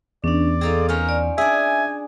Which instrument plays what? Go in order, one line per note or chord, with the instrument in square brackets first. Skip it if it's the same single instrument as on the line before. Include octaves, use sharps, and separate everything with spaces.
[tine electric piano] E2 [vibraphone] C#4 D4 [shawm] D5
[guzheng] C4 D#4 F4 [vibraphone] G#4 A4
[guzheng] C#4 C5 [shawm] A#4
[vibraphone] D5
[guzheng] D4 G#4 [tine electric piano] E5 [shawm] G#5